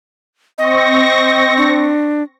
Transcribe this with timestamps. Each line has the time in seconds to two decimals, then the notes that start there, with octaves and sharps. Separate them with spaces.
0.58 C4 D#5 C#6 A#6
1.58 D4